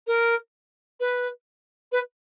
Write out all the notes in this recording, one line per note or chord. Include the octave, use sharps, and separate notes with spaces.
A#4
B4
B4